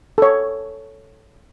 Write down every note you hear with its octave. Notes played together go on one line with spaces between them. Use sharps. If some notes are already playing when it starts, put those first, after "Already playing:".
A4 C#5